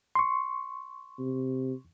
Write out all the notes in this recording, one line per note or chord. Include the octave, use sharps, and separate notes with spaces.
C6 C#6
C3